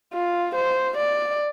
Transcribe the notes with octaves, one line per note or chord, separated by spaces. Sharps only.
F4
C5
D5